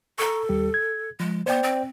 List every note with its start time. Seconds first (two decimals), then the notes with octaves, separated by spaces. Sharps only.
0.19 A4 A#5 C#6
0.49 D#2 G3 G4
0.74 G#6
1.20 F3 G#3
1.46 B3 C5 D5 G5
1.63 C4